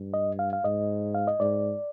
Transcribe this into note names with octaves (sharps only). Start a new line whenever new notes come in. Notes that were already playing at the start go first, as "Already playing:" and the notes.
Already playing: G2
D#5
F5
F5
G#2 D#5
F5
D#5
G#2 D5